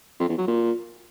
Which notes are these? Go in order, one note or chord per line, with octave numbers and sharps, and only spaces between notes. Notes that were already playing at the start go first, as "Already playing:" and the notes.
F2
E2
F#3
A#2